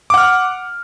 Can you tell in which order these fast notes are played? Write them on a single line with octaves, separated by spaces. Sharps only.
D6 F#5 F6